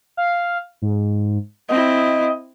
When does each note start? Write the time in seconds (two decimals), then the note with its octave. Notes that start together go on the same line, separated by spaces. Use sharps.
0.17 F5
0.82 G#2
1.69 C4 E4 D#5